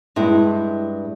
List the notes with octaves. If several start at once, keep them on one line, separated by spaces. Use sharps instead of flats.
G2 G#3 E4